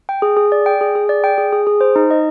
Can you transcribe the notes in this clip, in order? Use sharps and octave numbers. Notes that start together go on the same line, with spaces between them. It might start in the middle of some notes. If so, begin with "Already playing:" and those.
G5
G#4
G#4
D5
G5
G#4
G#4
D5
G5
G#4
G#4
G#4
C5
D#4
D#5